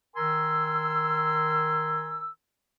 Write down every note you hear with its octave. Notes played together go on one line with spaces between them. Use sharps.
D#3 A#4 G#5 A#5 C6 E6